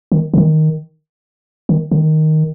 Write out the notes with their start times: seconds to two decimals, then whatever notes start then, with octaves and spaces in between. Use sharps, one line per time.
0.12 D#3
0.34 D3
0.38 D#3
1.69 D#3
1.91 D3
1.96 D#3